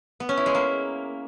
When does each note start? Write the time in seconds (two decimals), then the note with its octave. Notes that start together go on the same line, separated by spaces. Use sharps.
0.20 B3
0.29 C#4
0.37 E4
0.46 G#3
0.55 A#3